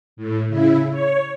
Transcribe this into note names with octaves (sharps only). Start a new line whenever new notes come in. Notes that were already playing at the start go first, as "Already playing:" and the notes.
A2
C#3 E4
C#5